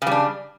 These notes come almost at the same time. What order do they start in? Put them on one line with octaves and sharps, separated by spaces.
C#3 G3 D4